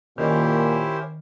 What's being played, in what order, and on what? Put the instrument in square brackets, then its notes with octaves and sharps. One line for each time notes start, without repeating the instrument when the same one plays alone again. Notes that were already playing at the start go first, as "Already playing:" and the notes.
[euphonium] A#2 [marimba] D#3 [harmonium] C#4 A#4 [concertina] E4 G4 C5